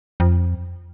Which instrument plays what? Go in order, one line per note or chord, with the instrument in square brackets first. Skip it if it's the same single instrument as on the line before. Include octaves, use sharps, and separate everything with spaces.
[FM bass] F2